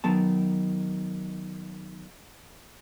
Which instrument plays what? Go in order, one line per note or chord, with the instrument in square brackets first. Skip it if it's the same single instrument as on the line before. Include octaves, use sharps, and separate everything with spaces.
[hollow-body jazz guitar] D#3 F#3 B3 A5